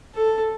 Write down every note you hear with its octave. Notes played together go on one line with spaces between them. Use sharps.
A4